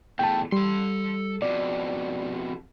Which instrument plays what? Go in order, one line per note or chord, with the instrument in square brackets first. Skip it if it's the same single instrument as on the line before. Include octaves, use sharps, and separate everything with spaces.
[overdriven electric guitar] E2 A3 [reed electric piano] G5 A5
[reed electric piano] G3 [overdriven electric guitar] A4 C6
[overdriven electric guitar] F2 B2 [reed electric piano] D5